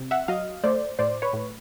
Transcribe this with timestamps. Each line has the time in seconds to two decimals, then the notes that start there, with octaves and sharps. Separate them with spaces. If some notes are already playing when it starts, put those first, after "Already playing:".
Already playing: C3
0.11 E5 F#5
0.28 F#3 D#5 F5
0.64 A3 C5 D5
0.99 A2 C5 D5
1.22 B4 C#5
1.33 A2